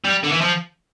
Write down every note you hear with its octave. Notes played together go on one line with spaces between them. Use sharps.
G3
D3
E3
F3